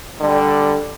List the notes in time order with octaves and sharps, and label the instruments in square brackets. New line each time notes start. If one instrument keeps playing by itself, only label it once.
[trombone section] D3 G3